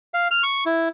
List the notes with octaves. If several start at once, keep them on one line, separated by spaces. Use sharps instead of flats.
F5
F6
C#6
E4